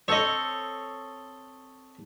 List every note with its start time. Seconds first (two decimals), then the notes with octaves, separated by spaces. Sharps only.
0.08 C4 A4 C#5 D#5